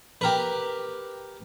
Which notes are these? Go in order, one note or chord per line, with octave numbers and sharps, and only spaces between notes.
G4 A#4 B4